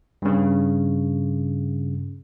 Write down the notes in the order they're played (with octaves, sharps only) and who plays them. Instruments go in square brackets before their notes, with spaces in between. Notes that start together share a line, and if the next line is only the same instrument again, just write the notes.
[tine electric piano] G2 C#3